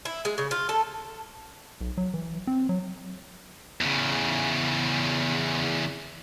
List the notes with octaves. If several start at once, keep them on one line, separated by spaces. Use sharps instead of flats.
E4
G#3
C#3
F4
A4
B1
F#3
E3
C4
F#3
E2 C#3